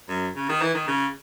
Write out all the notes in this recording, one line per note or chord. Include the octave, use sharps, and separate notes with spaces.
F#2
C#3
D#3
E3
D#3
C#3